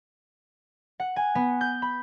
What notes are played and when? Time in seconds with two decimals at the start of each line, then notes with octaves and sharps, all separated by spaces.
1.00 F#5
1.16 G#5
1.35 B3
1.61 G6
1.82 B5